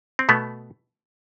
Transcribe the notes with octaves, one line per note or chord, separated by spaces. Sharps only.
C4
B2 A3 B3